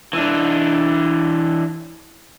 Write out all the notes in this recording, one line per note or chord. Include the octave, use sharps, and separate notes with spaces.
E3 D4